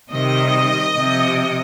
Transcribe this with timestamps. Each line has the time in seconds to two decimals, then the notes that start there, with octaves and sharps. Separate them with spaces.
0.12 C3 D#3 G3 D#5
0.96 C3 F3